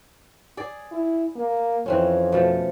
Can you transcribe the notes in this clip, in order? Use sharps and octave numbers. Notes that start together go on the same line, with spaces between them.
G#4 D5
E4
A#3
F2 E3 C4 C#4
B2 F3 A3